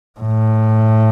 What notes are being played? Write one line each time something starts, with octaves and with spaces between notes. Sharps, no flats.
A2